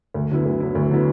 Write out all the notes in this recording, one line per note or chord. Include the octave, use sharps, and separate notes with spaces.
D2
D3 F#3 B3 E4
D2
D3 F#3 B3 E4
D2
D3 F#3 B3 E4